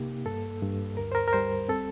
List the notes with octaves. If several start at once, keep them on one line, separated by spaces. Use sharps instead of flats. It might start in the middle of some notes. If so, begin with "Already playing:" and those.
Already playing: C3 A#3 D#4 G4
G2 A4
G2
D2 A#4
C5
A#4
A#4
G3 C5
C4 A4